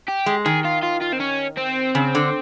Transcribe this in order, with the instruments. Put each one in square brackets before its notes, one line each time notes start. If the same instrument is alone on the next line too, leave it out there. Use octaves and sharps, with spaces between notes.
[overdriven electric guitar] G4
[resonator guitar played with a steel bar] G#3
[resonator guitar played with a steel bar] D#3 [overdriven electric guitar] G#4
[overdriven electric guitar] F4
F4
F4
C4
C#4
C4
[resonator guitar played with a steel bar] C#3
D3